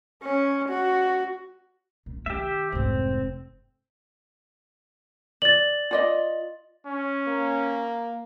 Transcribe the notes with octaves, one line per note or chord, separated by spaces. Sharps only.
C#4
F#4
A#2
D#3 G4 E5
F1 G#2 C4
D5 A6 F#7
F4 D5 D#5
C#4
A#3